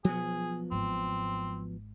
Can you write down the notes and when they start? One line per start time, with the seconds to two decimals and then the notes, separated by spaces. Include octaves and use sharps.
0.05 B2 F3 F#3 B3 G#4
0.71 G#1 G#2 C4